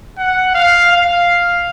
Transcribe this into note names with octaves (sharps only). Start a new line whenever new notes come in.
F#5
F5
F5